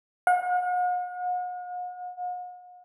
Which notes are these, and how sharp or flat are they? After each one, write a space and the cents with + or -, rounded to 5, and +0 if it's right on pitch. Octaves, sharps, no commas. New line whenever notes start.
F#5 -45